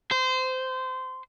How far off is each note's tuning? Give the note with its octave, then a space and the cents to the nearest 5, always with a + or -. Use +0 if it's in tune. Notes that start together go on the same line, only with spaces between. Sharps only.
C5 -20